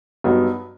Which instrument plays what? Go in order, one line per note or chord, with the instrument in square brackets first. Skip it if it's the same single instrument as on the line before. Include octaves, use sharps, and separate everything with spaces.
[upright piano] G2 F#3 B3 D#4